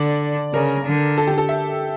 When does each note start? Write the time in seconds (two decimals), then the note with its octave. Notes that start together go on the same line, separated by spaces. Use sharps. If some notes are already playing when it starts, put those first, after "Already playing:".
Already playing: D3 D5
0.54 C#3 A#4
0.85 D3
1.18 A4
1.27 G4
1.38 A4
1.49 E5